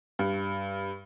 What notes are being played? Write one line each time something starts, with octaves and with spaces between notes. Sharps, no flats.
G2